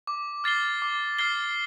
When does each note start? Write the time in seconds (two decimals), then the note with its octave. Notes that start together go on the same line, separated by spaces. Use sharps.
0.07 D6
0.44 F6 A6 C7 G7
0.82 D6
1.19 F6 A6 C7 G7